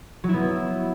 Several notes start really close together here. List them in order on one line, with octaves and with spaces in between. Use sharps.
F#3 E4 B3